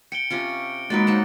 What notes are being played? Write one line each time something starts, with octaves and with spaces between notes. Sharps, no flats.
G5 C#7 D7 G7
C3 C#4 F4
F#3 G#3 A#3 D#4 B4 A6 D7
D#4 C5 F#5